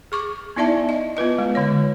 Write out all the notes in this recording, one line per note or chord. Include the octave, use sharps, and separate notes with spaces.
G#4 C#6 D6
B3 D#4 E4 D5 E5 A5
D#5
B3 F4 B4 D#5
G#3
D3 G#3 C#5